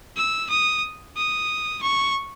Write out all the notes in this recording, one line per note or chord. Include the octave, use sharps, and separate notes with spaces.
E6
D#6
D#6
C#6